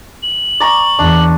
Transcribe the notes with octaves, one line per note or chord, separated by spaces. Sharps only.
F#7
D5 A#5 C#6
E2 D4